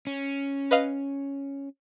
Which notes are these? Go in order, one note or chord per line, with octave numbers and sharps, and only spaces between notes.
C#4
B4 D#5 F5